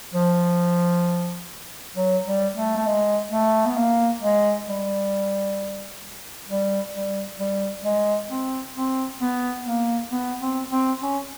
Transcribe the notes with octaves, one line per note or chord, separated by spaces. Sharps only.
F3
F#3
G3
A3
A3
G#3
A3
B3
A#3
G#3
G3
G3
G3
G3
G#3
C4
C4
B3
A#3
B3
C4
C4
C#4